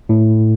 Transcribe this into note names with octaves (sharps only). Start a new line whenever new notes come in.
A2